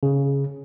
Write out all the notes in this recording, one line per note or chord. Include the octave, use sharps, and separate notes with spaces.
C#3